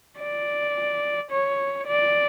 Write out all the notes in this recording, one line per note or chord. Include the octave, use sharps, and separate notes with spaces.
D5
C#5
D5